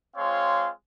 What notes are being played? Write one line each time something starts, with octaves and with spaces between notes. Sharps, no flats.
G#3 C4 F4 C#5 F5 C6